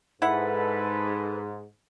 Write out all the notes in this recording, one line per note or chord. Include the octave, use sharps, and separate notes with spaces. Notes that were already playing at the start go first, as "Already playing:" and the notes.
G#2 E4 A4 B4 F#5